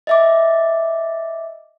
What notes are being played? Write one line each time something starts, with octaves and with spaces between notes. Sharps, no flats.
D#5 E5 D6